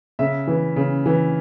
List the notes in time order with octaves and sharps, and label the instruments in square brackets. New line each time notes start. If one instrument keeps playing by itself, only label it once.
[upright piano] C#3 E5
E3
C#3
E3